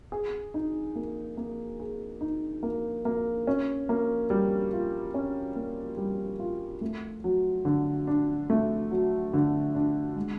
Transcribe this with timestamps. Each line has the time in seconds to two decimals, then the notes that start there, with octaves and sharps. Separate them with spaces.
0.12 G#4
0.54 D#4
0.96 A#3
1.37 A#3
1.80 G#4
2.21 D#4
2.63 A#3
3.05 A#3
3.47 C#4
3.89 A#3
4.30 G3
4.73 F4
5.14 C#4
5.56 A#3
5.97 G3
6.39 F4
6.81 A3
7.24 F#3
7.65 D3
8.07 D4
8.50 A3
8.91 F#3
9.33 D3
9.75 D4
10.16 G#3